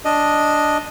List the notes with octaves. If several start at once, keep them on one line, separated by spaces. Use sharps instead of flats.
D4 D#5